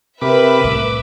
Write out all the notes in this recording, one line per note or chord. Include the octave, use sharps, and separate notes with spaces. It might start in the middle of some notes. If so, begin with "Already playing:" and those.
C3 A#4 B4 E5 B5 D6
C2 A2 D6